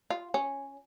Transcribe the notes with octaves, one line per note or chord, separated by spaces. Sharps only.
F4
C#4